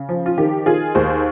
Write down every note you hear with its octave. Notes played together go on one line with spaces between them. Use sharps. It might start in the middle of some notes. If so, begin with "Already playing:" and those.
Already playing: C#3
F3
F4
D#3 G4
D#3 F4 G#4
D#2 G#4 C5